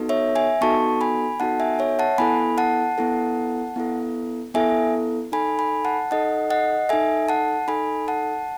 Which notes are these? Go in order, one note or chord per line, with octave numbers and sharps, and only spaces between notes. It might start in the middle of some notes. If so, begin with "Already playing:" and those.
Already playing: B3 D#4 F#4 A4
C#5 E5
E5 G#5
B3 D#4 F#4 A4 A5 C#6
G#5 B5
B3 D#4 F#4 A4 F#5 A5
E5 G#5
C#5 E5
F#5 A5
B3 E4 A4 G#5 B5
F#5 A5
B3 E4 A4
B3 E4 A4
B3 E4 A4 E5 G#5
D#4 A4 G#5 B5
G#5 B5
F#5 A5
D#4 A4 D#5 F#5
D#5 F#5
D#4 A4 E5 G#5
F#5 A5
D#4 A4 G#5 B5
F#5 A5